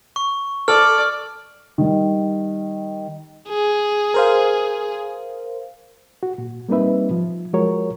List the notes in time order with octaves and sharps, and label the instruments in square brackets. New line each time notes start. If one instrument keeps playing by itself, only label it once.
[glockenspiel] C#6
[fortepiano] A4 [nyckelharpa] D5 [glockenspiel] F6
[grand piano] D#3 G3
[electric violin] G#4
[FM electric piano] A#4 C5 F5
[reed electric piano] F#4
A#2
G3 A#3 C4 D#4 B4 E5
F3
F3 G#3 F#4 A#4 C#5